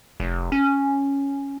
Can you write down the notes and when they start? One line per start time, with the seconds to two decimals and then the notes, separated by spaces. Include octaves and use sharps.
0.20 F1
0.52 C#4